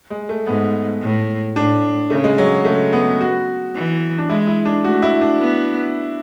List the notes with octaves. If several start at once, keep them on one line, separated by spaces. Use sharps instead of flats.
G#3
A3
G#2 B3
A2
A2 D4
C#3 A3
G#3
F#3
C#3 A3
B3
F#4
E3
D4
G#3 E4
E4
D4
A3 F#4
E4
D4
B3